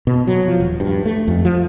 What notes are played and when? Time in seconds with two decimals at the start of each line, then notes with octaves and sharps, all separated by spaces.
0.07 B2
0.27 F#3
0.48 F3
0.60 D#1
0.80 G2
1.06 A3
1.28 F2
1.45 F3